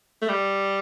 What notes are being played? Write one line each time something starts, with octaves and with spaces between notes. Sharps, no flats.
A3
G3